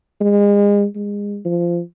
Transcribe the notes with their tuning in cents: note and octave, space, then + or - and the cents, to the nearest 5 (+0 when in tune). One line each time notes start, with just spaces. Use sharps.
G#3 -30
G#3 -30
F3 -15